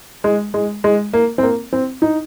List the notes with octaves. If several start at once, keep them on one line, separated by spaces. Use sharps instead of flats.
G#3
G#3
G#3
A#3
C4
A#3
C4
D#4